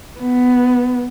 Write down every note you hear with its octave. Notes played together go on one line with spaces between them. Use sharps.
B3